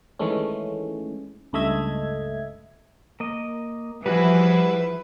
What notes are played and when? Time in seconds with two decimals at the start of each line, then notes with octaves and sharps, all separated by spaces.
0.19 D#3 E3 G#3 A3 C#4
1.53 C#2 G2 A3 D#5 E5 G#6
3.20 A#3 D#5
4.06 E3 F3 G3 E4 F#4 G#4 B4